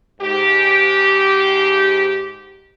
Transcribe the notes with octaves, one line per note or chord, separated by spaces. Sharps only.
G#2 G4